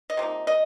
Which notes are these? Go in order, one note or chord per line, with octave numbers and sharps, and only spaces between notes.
D#5
C3 F3 A#3 D#4
D#5